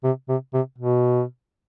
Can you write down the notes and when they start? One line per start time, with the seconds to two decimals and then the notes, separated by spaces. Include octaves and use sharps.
0.04 C3
0.29 C3
0.54 C3
0.79 B2